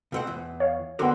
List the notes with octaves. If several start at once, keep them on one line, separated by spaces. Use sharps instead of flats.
B2 C4 F#5
E2
C#5 F5
D3 B3 F#4 A#4 C6 D6